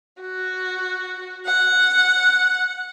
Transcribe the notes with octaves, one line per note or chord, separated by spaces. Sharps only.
F#4
F#5